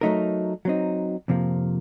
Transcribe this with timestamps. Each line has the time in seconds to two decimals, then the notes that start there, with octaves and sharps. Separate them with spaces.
0.01 F#3 A3 D#4 A#4
0.65 F#3 C4 D#4
1.28 F2 C3 F3 A#3